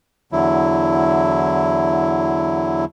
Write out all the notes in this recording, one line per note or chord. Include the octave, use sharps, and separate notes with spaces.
E2 D3 F#3 E4